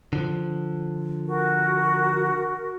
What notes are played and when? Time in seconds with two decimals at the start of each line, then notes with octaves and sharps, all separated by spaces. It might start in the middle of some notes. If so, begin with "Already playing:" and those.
0.13 D3 F3
1.27 F#4 A#4